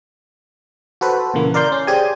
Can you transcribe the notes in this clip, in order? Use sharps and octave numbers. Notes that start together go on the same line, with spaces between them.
F#4 A4 B4 C5
A#2 C#3 E3 A#3
A#4 D5 F5 C6 G6
C#4
G4 G#4 C5 D5 G#5